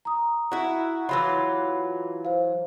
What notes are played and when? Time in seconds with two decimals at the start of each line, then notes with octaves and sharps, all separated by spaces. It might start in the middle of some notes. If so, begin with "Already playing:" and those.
0.05 A#5 D#6
0.52 E4 F#4
1.09 E3 F#3 F4 B5
2.25 C5 F5